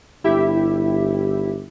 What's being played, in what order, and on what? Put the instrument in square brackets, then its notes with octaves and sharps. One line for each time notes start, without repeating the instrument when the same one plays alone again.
[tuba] G1 [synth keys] E4 G4 E5